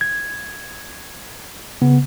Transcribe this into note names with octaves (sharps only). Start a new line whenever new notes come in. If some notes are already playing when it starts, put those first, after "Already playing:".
G#6
C#3 B3